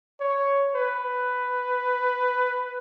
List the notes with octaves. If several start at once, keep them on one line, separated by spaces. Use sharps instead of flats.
C#5
B4